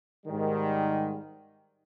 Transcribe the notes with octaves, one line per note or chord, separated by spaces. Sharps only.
G#2 D#3 G3